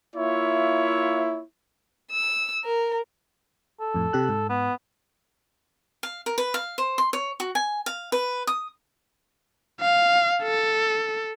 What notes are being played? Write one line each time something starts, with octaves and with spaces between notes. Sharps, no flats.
A#3 E4 F4 C#5 E5
E6
A#4
A4
F2 A2
C3 G4 F#6
G#2
B3
F5
A#4
B4
F5
C5
C6
C#5
F#4
G#5
F5
B4
D#6
F5
A4